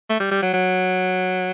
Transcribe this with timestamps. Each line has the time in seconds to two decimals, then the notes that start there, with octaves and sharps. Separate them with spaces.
0.10 A3
0.20 G3
0.32 G3
0.42 F#3
0.53 F#3